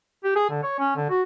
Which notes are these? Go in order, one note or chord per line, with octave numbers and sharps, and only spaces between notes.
G4
G#4
D3
C#5
C#4
D3
F#4